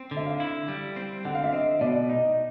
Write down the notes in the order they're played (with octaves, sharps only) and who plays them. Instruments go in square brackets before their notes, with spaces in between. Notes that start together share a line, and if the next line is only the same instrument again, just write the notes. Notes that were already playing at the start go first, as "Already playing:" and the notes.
Already playing: [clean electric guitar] C4
D3
[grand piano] E5
F5
[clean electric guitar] E4
G3
C4
[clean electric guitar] D3 [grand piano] F#5
[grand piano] F5
E5
[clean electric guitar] C4 [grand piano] D#5
[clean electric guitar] B2 [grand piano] D5
[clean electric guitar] D#4 [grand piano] D#5